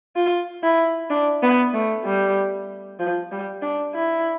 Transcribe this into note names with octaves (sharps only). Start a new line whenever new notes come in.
F4
E4
D4
B3
A3
G3
F3
G3
D4
E4